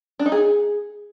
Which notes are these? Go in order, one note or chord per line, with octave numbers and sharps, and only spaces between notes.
D4
D#4
G#4